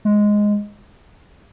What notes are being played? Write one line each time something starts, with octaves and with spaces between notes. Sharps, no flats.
G#3